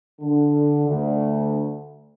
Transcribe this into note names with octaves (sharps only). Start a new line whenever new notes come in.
D3
D2